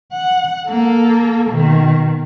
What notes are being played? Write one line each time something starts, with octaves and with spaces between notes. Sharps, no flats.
F#5
A#3 A4
B2 D#3